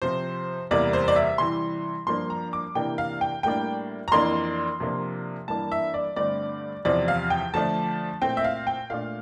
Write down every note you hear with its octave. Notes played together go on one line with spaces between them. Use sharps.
C3 F3 C4 C5
E2 C3 G3 A#3 D5
C5
D5
E5
C3 E3 G3 C6
G2 F3 A#3 D4 C6
A#5
D6
C3 E3 A#3 D4 G5
F5
G5
A2 G3 A#3 D4 G5
A#5
F2 E3 A#3 D4 C6
C3 F3 A#3 D4
G2 E3 A#3 D4 A5
E5
D5
G2 D3 A3 C4 D5
E2 C3 F3 C4 D5
F5
G5
D3 F3 A3 D4 A5
A#2 A3 C4 G5
E5
F5
G5
A#2 A3 D4 F5